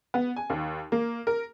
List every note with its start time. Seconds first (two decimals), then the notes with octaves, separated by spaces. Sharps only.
0.14 B3
0.36 G#5
0.50 D#2
0.92 A#3
1.27 A#4